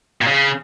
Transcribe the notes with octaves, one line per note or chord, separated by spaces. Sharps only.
A#2
C#3